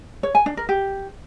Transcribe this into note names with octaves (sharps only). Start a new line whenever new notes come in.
C#5
G#5
D4
A#4
G4